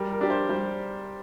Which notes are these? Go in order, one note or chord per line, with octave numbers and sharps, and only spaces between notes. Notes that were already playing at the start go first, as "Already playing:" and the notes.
Already playing: G3 A#4
A#4
D4 G4
C5
G3 C5